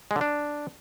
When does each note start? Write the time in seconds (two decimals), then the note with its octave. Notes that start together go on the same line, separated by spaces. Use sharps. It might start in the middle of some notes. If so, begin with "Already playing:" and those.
0.11 G#3
0.16 D3
0.21 D4